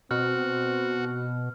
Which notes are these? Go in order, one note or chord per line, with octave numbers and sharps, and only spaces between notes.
B2 C4 F#4 F6